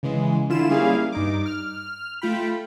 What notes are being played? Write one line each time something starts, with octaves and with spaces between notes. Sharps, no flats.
C#3 E3 G#3
D3 E4 F4 E7
G3 A#3 C#4 E4 G#4 F5
G2 D#4 D6
F6
A3 F4 G5 B5